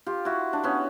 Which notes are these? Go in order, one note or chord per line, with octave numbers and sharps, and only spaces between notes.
F4 G4
E4 F#4
D4
B3 C#4